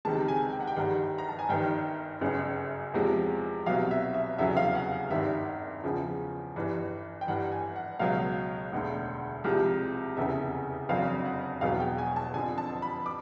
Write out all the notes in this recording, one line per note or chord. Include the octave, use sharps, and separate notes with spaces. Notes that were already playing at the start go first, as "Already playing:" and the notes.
C#2 C3 D#3 G#3 A5
G#5
G5
F#5
G5
G1 G2 D#3 G3 F#5
A#5
A5
G#5
G1 G2 D#3 G5
G1 F#2 C#3
E2 C3 F3 G#3
C2 B2 F#3 F5
E5
E5
F1 E2 C#3 F#3 E5
F5
F#5
G#1 G2 D#3 E5
E2 C#3 F3
G1 G2 E3
G5
G1 G2 E3 F#5
G#5
F#5
C#2 B2 F#3 F5
E1 D2 D3
C2 C3 F3 G#3
F1 E2 C#3 E5
F#1 F2 D3 F#3 F5
F#5
E1 E2 B2 F#3 F5
G5
G#5
A5
F2 D3 F3 G#5
A5
B5
D6